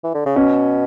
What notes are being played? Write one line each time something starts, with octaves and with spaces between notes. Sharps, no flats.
E3
D3
C#3
B2 C#4